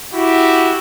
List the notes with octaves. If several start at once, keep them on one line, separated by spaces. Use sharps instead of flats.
E4 F#4 G4